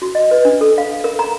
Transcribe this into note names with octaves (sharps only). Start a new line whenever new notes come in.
F#4
D#5
B4
D4
A4
F5
A#4
A#5